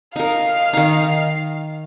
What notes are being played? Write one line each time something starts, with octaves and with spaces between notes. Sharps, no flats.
D#4 A#4 F5
D#3 D#4